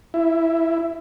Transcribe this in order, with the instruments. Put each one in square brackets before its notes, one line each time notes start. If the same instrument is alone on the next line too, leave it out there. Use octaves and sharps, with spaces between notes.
[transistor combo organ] E4